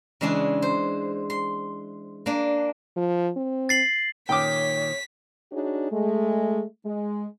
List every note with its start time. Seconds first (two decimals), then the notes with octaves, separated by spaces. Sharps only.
0.21 C#3 E3 G#3 D4 G#4
0.62 C5
1.30 C6
2.26 A#3 D4
2.96 F3
3.36 C4
3.69 A6 C7 F#7
4.29 A#2 D#3 C#5 G5 D6 B6
5.52 D4 D#4 F#4 G#4 C#5
5.91 G#3 A3
6.84 G#3